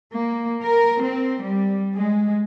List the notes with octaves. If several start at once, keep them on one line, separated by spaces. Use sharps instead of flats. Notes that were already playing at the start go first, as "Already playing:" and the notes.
A#3
A#4
C4
G3
G#3